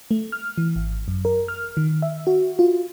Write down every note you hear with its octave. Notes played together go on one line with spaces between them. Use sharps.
A3
F6
E3
G#1
F#2
A#4
F6
D#3
E5
F#4
F4